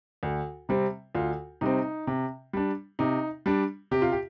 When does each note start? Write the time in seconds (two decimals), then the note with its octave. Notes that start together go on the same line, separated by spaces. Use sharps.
0.23 D2
0.69 C3 G3 C4
1.15 D2 F4
1.61 C3 G3 C4 D#4
2.07 C3
2.53 G3 D4
2.99 C3 D#4
3.46 G3 D4
3.91 C3 G4
4.02 F4
4.12 G4